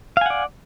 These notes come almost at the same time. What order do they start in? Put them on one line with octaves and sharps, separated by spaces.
F5 G#5 F#5 D5